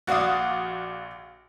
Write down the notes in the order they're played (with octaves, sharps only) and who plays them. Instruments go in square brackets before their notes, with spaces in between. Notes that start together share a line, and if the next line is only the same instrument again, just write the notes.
[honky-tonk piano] A#1 F#4 D5 F5 D#6